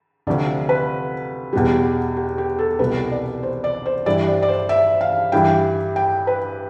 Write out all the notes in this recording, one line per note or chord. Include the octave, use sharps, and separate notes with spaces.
D2 C3 F3 D5
B4
E2 B2 G3
G4
G4
A4
C2 B2 G3 B4
D5
C5
D5
C5
G2 E3 G3 D5
D5
D5
C5
E5
F5
G2 E3 G3 G5
G5
B4